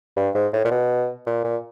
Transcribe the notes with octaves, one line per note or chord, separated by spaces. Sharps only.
G2
G#2
A2
A#2
B2
A#2
A#2